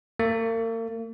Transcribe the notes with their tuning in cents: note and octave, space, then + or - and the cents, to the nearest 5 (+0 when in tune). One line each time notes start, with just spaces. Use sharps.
A#3 -40